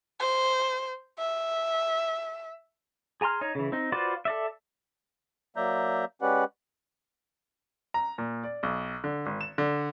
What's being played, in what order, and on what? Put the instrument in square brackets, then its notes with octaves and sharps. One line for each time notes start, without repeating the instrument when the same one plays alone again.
[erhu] C5
E5
[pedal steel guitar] G#4 G#5 A#5 C6 F6
D#4 C#5
C#3 E3
C4 D#4
F4 F#4 B4 C5 D5
A4 D5 E5
[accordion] F#3 A#3 D5 E5 A#5 G6
G#3 C#4 G4 B4 D5 F#5
[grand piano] A#5
A#2
D5
B1
D3
G#1
E7
D3